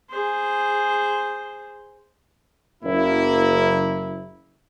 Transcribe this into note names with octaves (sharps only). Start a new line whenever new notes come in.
G#4 C5
F#1 A#3 E4